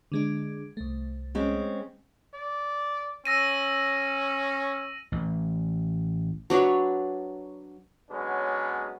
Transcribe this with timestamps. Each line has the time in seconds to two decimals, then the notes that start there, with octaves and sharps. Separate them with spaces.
0.12 D3 G#3 D4
0.77 C2 A3
1.35 G#3 C4 C#4
2.34 D5
3.25 C#4 E6 A#6 D#7
5.12 A1
6.50 F#3 D4 B4 C#5
8.10 D3 F#3 G#3 B3 C#4